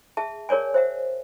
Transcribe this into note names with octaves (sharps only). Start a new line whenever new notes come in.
G#4 E5 A5
G#4 A#4 C#5 D5 G#5
C5 E5 F#5